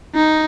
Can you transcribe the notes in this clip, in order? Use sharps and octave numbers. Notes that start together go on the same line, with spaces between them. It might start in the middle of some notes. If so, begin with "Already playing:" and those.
D#4